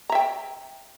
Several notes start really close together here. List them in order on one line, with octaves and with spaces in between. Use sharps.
A#5 E5 G5